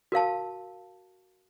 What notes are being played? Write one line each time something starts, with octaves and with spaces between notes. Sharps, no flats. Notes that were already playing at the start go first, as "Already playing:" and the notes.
F#4 A#4 F5 A5